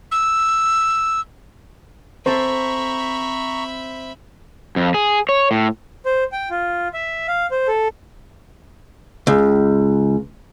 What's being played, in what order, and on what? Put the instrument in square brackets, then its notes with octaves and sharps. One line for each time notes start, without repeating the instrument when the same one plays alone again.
[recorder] E6
[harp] C4 A4 [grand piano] C5 [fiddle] E5 B5 [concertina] A#5 C#6
[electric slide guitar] F2
G#4
C#5
A2
[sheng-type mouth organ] C5
G5
F4
E5
F5
C5
A4
[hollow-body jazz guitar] C#2